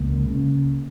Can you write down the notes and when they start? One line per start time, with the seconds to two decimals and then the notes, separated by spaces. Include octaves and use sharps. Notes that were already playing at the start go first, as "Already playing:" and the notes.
Already playing: C#2 A#3
0.26 C#3